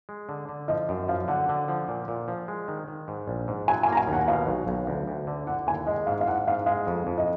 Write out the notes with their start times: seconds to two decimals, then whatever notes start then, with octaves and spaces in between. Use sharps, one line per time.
0.09 G#3
0.29 D3
0.49 D3
0.68 F3 D#5
0.89 F#2
1.08 F3 F5
1.28 D3 F#5
1.49 D3
1.68 F3
1.88 A#2
2.08 A#2
2.28 F3
2.48 G#3
2.68 D#3
2.88 D#3
3.08 G#2
3.28 A#1
3.48 G#2
3.68 F#3 G#5
3.83 G#5
3.88 A#3 A#5
3.97 G#5
4.08 D#2
4.13 F#5
4.28 B2 F5
4.47 B1
4.67 B1
4.87 D2
5.07 D2
5.27 D3
5.47 D3 F#5
5.67 D#2 G#5
5.87 G#3 D#5
6.07 G#2 F5
6.21 F5
6.27 G#2 F#5
6.48 G#2 F5
6.66 G#3 F5
6.87 F2
7.07 F2
7.18 D#5